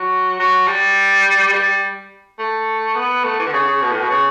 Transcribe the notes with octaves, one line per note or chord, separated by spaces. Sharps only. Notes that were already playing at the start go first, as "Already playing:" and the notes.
Already playing: F#3
F#3
G3
G3
A3
B3
A3
E3
D3
C#3
C#3
B2
A2
B2
C#3